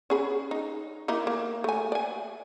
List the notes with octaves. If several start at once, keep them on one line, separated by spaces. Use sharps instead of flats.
C#4 G#4 B5
D#4
A#3 D#4 E4
A#3
A3 G#5
D5 G#5